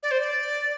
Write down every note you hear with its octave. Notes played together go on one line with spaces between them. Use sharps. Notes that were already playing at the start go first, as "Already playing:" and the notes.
D5
C5
D5